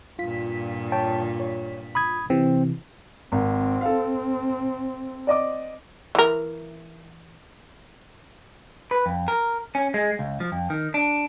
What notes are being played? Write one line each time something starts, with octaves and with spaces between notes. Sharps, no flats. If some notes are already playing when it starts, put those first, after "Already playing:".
G2 A#2 F4 B6
C#5 G5 A5
C#5
B5 D#6 G#6
C3 E3 C4
G#1 C4
A4 F5
D5 D#5 D6
E3 A#4
B4
F2
A#4
C#4
G#3
C#2
F3
F2
D#3
D4